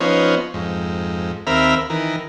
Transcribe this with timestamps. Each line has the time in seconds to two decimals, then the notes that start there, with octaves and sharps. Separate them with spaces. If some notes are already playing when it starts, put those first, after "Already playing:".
0.01 F3 B3 C#4 D#4 C5 C#5
0.54 F2 G#2
1.47 D#2 C4 A#4 E5 B5 F6
1.90 D#3 E3 A#4